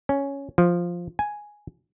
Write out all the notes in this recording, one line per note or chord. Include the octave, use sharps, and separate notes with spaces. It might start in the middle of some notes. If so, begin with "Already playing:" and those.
C#4
F3
G#5